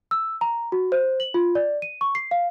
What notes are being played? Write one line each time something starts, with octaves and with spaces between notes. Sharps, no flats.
E6
A#5
F#4
C5
F#7
F4
D5
D#7
C#6
C7
F5